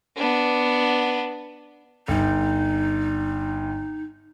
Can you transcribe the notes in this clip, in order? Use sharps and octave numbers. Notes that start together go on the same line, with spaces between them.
B3 D4
G1 D#4